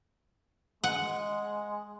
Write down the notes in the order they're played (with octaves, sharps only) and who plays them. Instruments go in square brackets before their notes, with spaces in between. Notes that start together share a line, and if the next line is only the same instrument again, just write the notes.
[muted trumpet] G#3 [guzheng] F#5